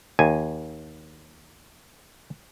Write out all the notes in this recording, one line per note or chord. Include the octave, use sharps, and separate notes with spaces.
D#2 G#5